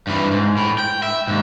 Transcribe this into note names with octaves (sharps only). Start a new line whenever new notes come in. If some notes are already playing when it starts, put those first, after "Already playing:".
G2 E3
G#2
A2
G5
E5
D#2 G#2